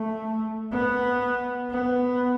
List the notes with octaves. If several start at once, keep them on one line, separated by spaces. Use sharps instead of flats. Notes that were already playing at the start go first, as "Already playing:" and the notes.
Already playing: A3
B3
B3